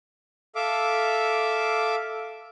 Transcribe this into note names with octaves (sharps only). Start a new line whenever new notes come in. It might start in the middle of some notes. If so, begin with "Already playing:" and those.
A4 E5 F5 D6